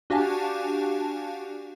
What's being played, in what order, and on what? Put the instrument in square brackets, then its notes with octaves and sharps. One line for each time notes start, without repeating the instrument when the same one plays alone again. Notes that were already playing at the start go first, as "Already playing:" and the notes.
[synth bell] D4 F#4 G4 F5 G#5 A5